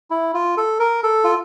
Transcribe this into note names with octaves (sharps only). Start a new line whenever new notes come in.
E4
F4
A4
A#4
A4
F4